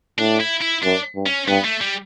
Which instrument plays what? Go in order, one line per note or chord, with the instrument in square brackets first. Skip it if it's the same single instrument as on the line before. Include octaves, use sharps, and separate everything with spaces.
[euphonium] A2 [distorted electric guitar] D4
[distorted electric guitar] E4
E4
[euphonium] F#2 [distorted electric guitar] D4
[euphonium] G2
[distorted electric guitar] C#4
[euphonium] G2 [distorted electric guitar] B3
[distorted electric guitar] A3
G3